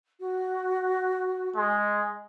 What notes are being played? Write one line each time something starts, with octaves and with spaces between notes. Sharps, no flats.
F#4
G#3